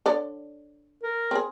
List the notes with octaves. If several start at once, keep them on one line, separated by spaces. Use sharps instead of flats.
D3 C#5 D5
A#4
C4 G#4